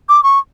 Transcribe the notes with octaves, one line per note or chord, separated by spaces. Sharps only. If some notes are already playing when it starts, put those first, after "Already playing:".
D6
C#6